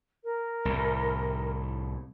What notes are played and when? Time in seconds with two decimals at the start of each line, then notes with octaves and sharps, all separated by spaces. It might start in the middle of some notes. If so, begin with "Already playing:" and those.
0.24 A#4
0.65 C2 A2